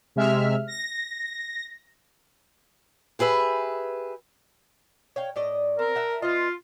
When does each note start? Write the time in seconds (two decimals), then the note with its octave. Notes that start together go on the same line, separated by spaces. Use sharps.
0.16 C3 G#3 E5 F6
0.67 A#6
3.19 G4 G#4 B4 E5
5.16 C#5 F5 G5
5.36 A2 D5 D#5
5.79 C4 A#4
5.95 E5 F#5 A5
6.22 B3 F4 D#5